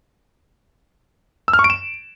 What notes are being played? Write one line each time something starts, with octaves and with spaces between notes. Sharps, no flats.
E6
F6
C#6
D7
E7